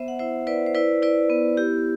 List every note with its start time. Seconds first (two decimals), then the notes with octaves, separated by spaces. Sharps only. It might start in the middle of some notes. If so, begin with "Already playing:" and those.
Already playing: B3 C5 E5
0.08 F#5
0.19 E4 C5 E5
0.47 E4 B4 D5
0.66 C5
0.75 E4 B4 D5
1.02 E4 B4 D5
1.30 B3
1.57 E4 G4